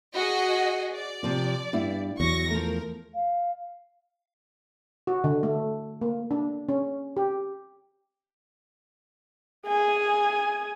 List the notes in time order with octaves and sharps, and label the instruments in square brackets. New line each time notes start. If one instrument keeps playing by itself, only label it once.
[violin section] F#4 G#4 D#5
D5
[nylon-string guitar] C3 F3 C4
G2 B3 E4
[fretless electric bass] E2 [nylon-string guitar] F#3 [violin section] C#6 A#6
[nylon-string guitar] F3 A3 [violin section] A#4
[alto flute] F5
[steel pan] F#4
D3
A3
A#3
D4
C#4
G4
[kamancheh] G#4 G#5